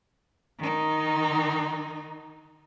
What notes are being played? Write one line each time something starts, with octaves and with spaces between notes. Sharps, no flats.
D#3 D#4